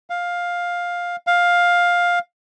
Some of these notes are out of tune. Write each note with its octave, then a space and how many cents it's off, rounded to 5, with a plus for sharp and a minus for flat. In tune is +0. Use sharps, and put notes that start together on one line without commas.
F5 +10
F5 +10